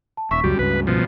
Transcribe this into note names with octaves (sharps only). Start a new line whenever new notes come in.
A5
D#1 E5 C#6 B6
C#2 F#2 G3 F#4
C#2 G2 C#3 B4
B2 F3